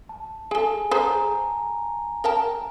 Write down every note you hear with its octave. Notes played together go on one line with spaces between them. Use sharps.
A5
G#4 A4 G#5
G#4 A4 C5 A#5
A#4 G5 A5